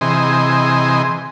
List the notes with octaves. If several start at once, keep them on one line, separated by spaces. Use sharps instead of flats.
C3 E3 G#4 D#5 C6